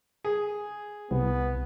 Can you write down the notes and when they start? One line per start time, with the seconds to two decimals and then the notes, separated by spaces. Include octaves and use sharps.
0.25 G#4
1.11 C2 B3